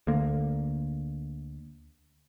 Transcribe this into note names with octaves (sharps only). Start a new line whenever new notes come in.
D2 D3 A#3